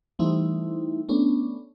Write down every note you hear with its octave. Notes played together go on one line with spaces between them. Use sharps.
E3 G3 A3 C4 D#4 E4
A3 B3 C#4 D4